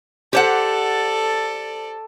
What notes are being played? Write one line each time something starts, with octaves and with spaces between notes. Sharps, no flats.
G4 A4 C5 D5 F#5